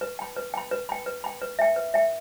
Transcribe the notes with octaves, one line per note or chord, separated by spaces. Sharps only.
B4
G5 B5
B4
G5 B5
B4
G5 B5
B4
G5 B5
B4
E5 G5
B4
E5 G5